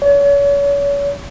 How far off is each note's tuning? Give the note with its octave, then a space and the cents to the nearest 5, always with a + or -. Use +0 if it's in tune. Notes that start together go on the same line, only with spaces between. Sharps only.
C#5 +35